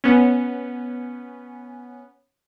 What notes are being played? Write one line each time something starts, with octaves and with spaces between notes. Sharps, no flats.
B3 C#4